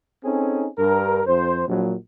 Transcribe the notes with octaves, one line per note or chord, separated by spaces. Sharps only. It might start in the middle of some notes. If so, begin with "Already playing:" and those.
C4 C#4 D#4 G#4 A4
G2 A#4
F2 C5
A#1 F#3